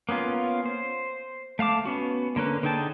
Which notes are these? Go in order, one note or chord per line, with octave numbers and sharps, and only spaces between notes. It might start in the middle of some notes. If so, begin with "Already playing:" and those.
A#3 B3 C#4 F4
C5
A3 F5 A5 D6
B3 C#4 F#4
D3 A#3 C#4 B4
D3 D#4 G#4 G5 A5